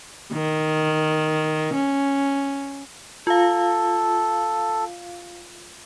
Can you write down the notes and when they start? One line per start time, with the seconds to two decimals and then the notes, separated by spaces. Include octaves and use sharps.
0.33 D#3
1.74 C#4
3.27 F4 A4 F5